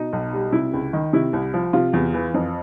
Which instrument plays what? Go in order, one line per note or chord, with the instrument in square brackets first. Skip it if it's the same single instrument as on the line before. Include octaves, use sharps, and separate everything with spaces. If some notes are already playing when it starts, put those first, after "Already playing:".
Already playing: [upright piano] B2 D#4
B1
G3
C3 E4
C#2
D#3
C3 E4
C2
F3
C3 F4
E2
E3
F2